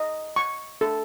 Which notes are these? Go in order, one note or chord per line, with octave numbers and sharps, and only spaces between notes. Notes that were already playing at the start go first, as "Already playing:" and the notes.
Already playing: D#5
C#6
A4